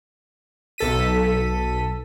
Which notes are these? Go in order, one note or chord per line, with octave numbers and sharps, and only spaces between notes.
B1 A4 B6 D#7